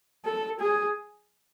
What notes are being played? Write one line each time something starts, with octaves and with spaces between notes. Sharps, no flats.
A4
G#4